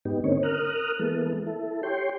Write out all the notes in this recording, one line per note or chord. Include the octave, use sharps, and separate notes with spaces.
G#2 B3 D#4 G4
D3 A#3 C4 C#4 D#4 C#5
A#4 D#6 F6 F#6
E3 G#3 A#3 B3 A4
E4 A4
G4 C#5 G5 C6